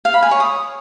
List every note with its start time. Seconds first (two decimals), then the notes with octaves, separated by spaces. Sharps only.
0.05 F5
0.14 B5
0.22 G#5
0.31 C#5
0.40 D#6